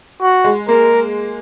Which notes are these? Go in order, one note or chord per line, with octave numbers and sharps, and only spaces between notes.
F#4
G#3
A#3 A#4